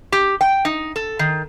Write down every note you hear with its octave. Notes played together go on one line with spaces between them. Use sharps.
G4
G5
D#4
A4
D#3